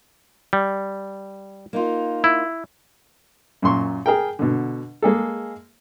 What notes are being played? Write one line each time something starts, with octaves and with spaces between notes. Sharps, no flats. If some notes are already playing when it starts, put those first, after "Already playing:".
G3
A#3 D#4 F4
E4
F#2 A#2 C6 C#6
G#4 A#4 G5
B2 D3
G#3 A#3 G#4 A4